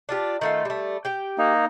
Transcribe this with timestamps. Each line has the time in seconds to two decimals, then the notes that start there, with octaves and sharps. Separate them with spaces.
0.09 D4 F4 G4
0.41 D#3 A3 F4
0.65 G3 A3
1.05 G4 G5
1.38 A#3 D#4